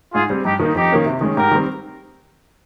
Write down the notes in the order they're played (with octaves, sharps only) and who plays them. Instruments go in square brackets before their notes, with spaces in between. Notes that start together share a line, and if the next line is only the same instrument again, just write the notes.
[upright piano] G#2 [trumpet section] F4 G#4
[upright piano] G3 C4
[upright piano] G2 [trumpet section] D#4 G4
[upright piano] D#3 A#3 D#4
[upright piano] F2 [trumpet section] D#4 G4
[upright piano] D#3 A#3 C#4
C3
D#3 G#3 C#4
[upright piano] G#2 [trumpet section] G4 A#4
[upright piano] D#3 G3 C4